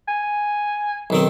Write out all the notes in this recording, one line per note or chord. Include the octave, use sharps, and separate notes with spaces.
G#5
B1 D#3 C4